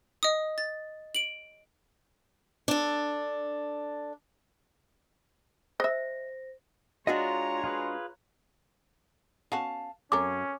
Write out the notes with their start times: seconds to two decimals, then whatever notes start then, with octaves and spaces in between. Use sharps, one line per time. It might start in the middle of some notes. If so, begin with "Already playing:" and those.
0.23 D#5 D#6
0.58 A6
1.15 D7 F#7
2.68 D4 A4
5.80 C5 D#5 E5 A#6
7.07 G#3 D4 F4 F#4 C#5 D#5 A#5
7.64 F4 G#4 B4
9.52 B3 C#4 F#4 F5 A5
10.12 F#2 C4 C#4 A4 A#4 D6